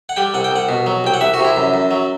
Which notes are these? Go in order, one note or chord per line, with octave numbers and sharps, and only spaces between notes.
F#5
G3 G5
C2 F#5
G5
C2 F#5
B2
F#3
C2 G5
F#5
C2 E5
F#4
C3
E4
F#2
F#2
F#3